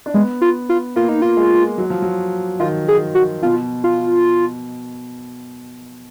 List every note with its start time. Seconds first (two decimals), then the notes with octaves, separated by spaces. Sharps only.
0.06 D4
0.14 G#3 B3
0.41 F4
0.69 F4
0.96 A#3 F4
1.09 D#4
1.22 F4
1.37 G#3
1.78 F#3
1.90 F3
2.02 F#3
2.60 D#3 F4
2.88 G#4
3.15 F#4
3.43 B2 F4
3.84 F4